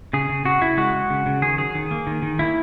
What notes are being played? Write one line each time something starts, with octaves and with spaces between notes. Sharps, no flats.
C#3 G#4
C#3
C#3 F#4
C#3 E4
G#3 F#4
G#3
C#3
C#3
D#3 G#4
F#3 G#4
D#3
A#3
D#3
D#3
A#3 E4